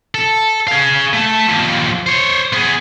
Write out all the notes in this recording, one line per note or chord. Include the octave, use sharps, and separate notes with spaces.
A4
G#4 F5
A3 A5
D#2 F3
C5 C#5
B3 G#4